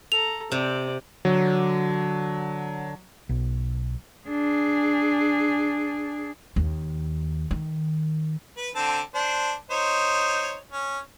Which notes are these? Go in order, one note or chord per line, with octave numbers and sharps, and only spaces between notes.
A4 A#5 F7
C3 C4 D5
D3 F#3
B1
D4 G#4
D#2
D#3
B4
D3 C4 A5
D4 C5
D#4 C5 C#5
C#4